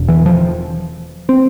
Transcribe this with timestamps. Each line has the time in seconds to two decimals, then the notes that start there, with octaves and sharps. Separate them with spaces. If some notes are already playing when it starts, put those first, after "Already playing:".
Already playing: E1 E2 B2
0.08 E3
0.26 F3
1.29 C4